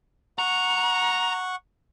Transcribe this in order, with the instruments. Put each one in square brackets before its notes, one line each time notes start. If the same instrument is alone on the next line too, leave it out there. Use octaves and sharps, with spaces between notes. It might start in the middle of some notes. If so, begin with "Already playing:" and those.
[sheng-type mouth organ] F#5 C#6 [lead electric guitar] A#5